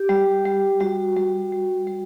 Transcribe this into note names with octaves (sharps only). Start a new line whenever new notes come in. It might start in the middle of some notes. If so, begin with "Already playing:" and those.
Already playing: G4
G3
G3
G3 F#4
G3
G3
G3